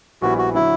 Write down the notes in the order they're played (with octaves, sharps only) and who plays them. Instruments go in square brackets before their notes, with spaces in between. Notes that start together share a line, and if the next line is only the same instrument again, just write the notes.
[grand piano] A#1 A#2 G3 B3 E4 [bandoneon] F#4
[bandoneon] F#4
[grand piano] D3 F#3 [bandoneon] E4